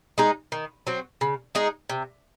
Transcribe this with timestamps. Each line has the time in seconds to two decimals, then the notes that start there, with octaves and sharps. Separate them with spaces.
0.18 G#3 D#4 G#4
0.52 D#3
0.87 F#3 C4
1.21 C#3
1.55 G#3 D#4 G#4
1.89 C3